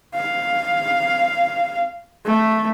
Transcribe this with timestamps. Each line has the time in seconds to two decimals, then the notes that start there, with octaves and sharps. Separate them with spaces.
0.14 F5
2.26 A3